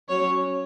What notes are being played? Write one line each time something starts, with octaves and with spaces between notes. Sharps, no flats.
F#3 C#4 C#5